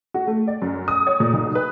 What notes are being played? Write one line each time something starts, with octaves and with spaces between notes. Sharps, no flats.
F#4
A3
D5
F#2
D#6
C#5
A#2
B1
B4